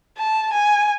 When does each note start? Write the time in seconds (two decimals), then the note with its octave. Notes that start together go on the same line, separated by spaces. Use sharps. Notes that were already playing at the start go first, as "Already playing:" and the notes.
0.18 A5
0.53 G#5